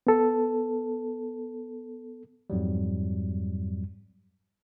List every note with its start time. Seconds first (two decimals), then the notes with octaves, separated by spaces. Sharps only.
0.07 B3 A4
2.50 F2 G#2 F#3 G3